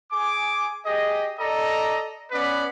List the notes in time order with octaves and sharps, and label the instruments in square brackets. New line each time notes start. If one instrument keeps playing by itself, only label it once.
[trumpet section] G#4 G#5 D6
G4 G#4 D#5
A4 D5 D#5 A#5
B3 C#4 B4 D5